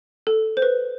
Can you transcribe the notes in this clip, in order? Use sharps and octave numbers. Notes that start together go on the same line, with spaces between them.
A4
C5
B4